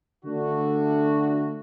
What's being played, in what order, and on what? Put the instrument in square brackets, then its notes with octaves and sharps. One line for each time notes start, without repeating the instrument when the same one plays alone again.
[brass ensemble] D3 A3 D4 F#4